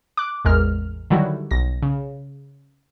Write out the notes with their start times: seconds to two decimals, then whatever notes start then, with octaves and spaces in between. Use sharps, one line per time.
0.17 D6 F#6
0.45 A1 E2 G#3 A#4 F6
1.10 D3 D#3 F#3 G3 E4 F#4
1.51 B1 A#6
1.82 C#3